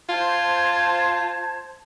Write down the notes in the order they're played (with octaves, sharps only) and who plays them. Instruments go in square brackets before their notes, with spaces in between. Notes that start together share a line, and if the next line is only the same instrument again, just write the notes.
[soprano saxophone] F4 [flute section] C5 A5 G#6